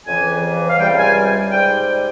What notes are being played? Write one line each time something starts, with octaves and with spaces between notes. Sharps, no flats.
F2 C#3 E3 G#5
F5
C#2 C3 G3 G5
G#5
G#2 G3 G5